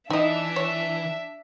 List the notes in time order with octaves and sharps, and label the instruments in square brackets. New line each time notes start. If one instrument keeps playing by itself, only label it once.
[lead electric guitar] E3 [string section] D4 E5 [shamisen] D#4 D#5
[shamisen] C#5